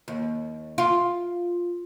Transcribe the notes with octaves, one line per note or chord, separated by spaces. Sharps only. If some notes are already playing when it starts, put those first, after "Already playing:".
D#2
F4